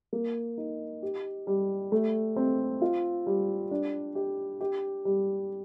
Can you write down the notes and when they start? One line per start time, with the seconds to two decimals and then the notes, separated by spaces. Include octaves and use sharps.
0.13 A#3
0.58 D#4
1.03 G4
1.47 G3
1.92 A3
2.36 C4
2.82 F4
3.27 G3
3.71 D4
4.15 G4
4.60 G4
5.05 G3